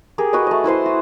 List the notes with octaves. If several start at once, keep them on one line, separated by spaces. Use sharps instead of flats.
G4 G#4 A#4
F#4 B4 D#5
A3 D#5
E4 B4 C5 C6
F#4